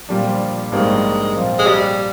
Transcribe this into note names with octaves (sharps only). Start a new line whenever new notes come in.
A#2 F3 G3 D4
A#1 G#2 G3 G#3 A#3 D4
A#2 F3 C4 F4
G#3
G3